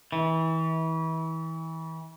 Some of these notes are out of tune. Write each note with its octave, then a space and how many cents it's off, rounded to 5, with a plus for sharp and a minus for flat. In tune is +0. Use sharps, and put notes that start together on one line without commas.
E3 -30